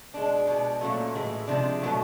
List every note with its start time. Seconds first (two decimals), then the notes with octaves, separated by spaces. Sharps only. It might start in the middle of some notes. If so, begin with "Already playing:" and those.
0.13 B2 G#3 D4
0.47 B2 G#3
0.81 A#2 F#3 A3 C#4
1.15 A2 E3 G#3
1.47 C3 F3 G#3 D4
1.82 B2 F#3 A3